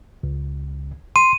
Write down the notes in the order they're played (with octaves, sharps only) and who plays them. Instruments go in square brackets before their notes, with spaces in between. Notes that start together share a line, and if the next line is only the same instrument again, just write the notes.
[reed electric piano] C#2
[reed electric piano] C6 [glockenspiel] D#7